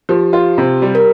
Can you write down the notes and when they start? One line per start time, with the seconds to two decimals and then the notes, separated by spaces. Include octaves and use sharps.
0.09 F3 G4
0.33 F4
0.58 C3
0.82 G3
0.95 A#4